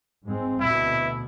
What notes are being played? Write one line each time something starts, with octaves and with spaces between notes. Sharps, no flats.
G#2 G#3 C4
D2 B2 E4